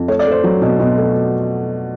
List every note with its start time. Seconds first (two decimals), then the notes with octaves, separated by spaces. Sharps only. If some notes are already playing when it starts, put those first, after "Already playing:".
Already playing: F2
0.08 A3 C#5
0.19 D5
0.26 A3 C5
0.44 F#3
0.62 B2
0.80 B2
0.97 A3